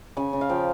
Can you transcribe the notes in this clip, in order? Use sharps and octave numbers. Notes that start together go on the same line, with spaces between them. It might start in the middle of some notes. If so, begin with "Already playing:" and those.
C#3 G#5
C#3
F5
F3 G5